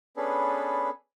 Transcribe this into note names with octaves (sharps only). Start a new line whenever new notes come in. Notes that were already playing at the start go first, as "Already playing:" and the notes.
B3 C#4 D4 G#4 A4 B4